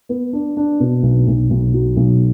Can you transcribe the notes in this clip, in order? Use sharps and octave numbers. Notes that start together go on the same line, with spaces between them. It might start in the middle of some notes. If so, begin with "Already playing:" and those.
B3
D4
D4
B2
B1
B1
B1
F#3
B1